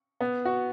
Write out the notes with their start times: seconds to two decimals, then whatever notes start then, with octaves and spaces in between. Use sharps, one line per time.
0.21 B3
0.45 F#4